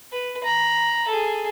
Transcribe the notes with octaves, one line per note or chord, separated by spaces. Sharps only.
B4
A#5 B5
G#4 A4